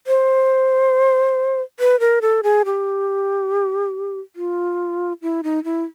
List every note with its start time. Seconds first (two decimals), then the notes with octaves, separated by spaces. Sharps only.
0.07 C5
1.80 B4
2.00 A#4
2.22 A4
2.43 G#4
2.65 G4
4.36 F4
5.22 E4
5.43 D#4
5.64 E4